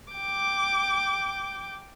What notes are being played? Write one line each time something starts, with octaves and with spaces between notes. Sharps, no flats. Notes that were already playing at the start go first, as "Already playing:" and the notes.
G5 D6